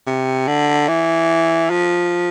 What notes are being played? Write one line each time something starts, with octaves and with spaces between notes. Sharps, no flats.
C3
D3
E3
F3